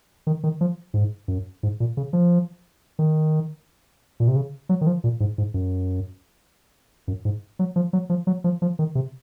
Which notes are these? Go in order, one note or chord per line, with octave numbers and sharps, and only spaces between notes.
D#3
D#3
F3
G#2
F#2
G#2
A#2
C#3
F3
D#3
A#2
C3
C#3
F#3
D#3
F3
A#2
G#2
G#2
F#2
F#2
G#2
F#3
F3
F#3
F3
F#3
F3
F3
D#3
C3